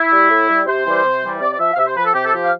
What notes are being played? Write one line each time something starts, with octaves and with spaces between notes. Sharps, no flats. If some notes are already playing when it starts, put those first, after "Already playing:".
Already playing: E4
G3
A2
G3
C3 C5
E3 G3
C3
E3 G3
C3 D5
D5
F3 E5
F5
C3 E5
C5
F3 B4
A4
C3 G4
A4
F3 G4
F5